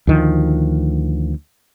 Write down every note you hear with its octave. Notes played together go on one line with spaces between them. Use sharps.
D2 D#3 F3